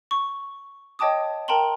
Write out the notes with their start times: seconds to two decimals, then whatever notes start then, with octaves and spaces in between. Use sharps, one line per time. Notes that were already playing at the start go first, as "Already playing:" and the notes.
0.11 C#6
0.99 C#5 D#5 G5 A5 D6 D#6
1.48 A#4 G5 A5 A#5 C6 F#7